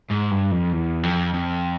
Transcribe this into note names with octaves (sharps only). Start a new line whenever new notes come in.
G#2
G2
F2
E2
F2
F2